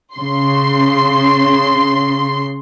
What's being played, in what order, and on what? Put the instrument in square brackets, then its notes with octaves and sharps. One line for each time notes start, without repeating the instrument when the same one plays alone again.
[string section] C#3 C6